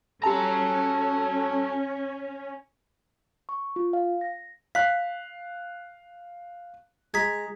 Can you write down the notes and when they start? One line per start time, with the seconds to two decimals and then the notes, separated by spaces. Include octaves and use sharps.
0.23 C#4 F#4 G4 A4 A5 A#5
3.49 C#6
3.76 F4
3.93 F5
4.21 A#6
4.75 F5 F#6 B6
7.14 G#3 G#4 A#5 G#6 B6